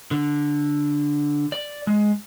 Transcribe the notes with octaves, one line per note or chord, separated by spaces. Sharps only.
D3
D5
G#3